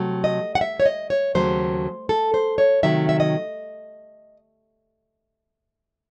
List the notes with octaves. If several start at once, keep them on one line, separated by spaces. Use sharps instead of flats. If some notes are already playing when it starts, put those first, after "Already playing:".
Already playing: C3 F#3 A3
D#5
F#5
E5
C#5
D#5
C#5
D#2 C#3 F#3 A3 C5
A4
C5
C#5
C3 D#3 F#3 A3 E5
E5
D#5